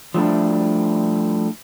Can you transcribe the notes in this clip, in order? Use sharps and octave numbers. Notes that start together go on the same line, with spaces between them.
F3 G3 A3 D4 E4